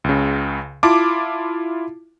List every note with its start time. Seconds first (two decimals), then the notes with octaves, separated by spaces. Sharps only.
0.04 C#2 C#3
0.83 E4 F4 A5 D6